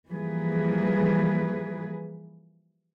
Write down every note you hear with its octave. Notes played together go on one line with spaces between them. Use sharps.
E3 F3 G3 A#3 G#4 B4